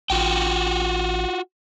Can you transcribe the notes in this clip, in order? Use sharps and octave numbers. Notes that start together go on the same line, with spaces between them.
A1 F4 F#4 G5